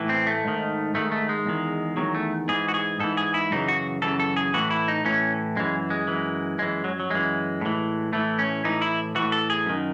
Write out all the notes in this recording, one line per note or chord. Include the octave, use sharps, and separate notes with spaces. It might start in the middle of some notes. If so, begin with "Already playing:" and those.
Already playing: A2 E3
C4
A3
G#2 D#3
G#2 D#3 A3
A3
G#3
E2 D#3
E2 D#3 F#3
A3
G#2 E3 G#4
F#4
G#4
G#2 E3 A4
G#4
E4
F#2 C#3 E3 D#4
F#4
F#2 C#3 E3 A4
A4
G#4
A2 E3 F#4
E4
D#4
A2 E3 C#4
F#2 E3 G#3
G#3
F#2 E3
F#2 E3 G#3
F#3
F#3
F#2 E3 G#3
A2 E3
A2 E3 A3
C#4
A2 E3 D#4
E4
A2 E3 F#4
A4
G#4
F#2 D#3